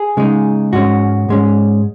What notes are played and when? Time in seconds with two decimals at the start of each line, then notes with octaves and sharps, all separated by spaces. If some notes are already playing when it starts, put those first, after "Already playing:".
Already playing: G#4
0.17 C#3 G#3 D#4
0.72 G#2 G#3 C#4 F#4
1.29 G#2 G#3 C#4